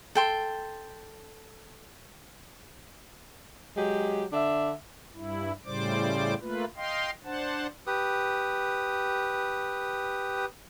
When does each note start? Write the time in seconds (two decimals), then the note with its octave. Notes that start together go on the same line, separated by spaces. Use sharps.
0.15 A4 G5 C6
3.77 F#3 G#3 G4
4.33 D3 D4 E5
5.14 G2 E4
5.65 A2 C#3 G3 C5 D5 D6
6.41 A3 A#3 F4 B4
6.76 D#5 F5 G5 C6
7.24 D4 C5 F#5 A5
7.87 G4 B4 D#6